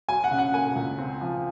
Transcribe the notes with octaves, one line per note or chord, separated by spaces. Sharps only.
F#3 G#5
F#5
C#3
F#5
A#3 G#5
C#2
C4
F3